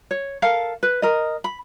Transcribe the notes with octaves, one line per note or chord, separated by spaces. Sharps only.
C#5
A4 A#4 F5
B4
A#4 D#5
B5